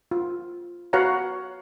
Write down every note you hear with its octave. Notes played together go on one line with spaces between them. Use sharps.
F4
F#4 B4 C#5 F5 F#5 A#5